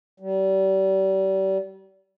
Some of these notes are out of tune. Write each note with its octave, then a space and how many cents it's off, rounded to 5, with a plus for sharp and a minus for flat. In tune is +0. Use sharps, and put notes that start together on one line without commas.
G3 -35